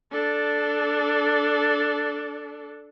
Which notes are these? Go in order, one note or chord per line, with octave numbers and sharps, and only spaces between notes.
D4 A4